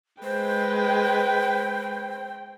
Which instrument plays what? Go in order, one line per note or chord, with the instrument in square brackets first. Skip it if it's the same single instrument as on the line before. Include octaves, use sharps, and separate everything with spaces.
[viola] G#3 B4 [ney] C5 [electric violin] G5